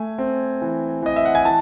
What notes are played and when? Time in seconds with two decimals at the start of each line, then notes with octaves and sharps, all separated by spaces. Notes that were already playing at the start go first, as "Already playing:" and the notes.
Already playing: A3 G#5
0.18 C4
0.62 E3
1.02 E3 D#5
1.16 E5
1.25 F#5
1.35 G#5
1.45 E3 A5